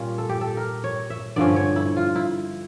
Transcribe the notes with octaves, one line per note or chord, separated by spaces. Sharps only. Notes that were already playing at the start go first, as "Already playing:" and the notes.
Already playing: A#2 G3 C#4 F4
A4
G4
A4
A#4
C#5
E5
G2 D3 F3 C#4 D5
C#5
E4
F4
E4